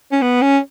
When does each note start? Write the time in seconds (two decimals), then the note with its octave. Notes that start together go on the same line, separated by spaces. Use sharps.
0.12 C#4
0.22 B3
0.42 C#4